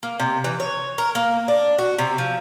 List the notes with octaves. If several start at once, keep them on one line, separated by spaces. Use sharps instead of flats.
A#3
C3
E3
C#5
A#4
A#3
D4
F#4
C3
F3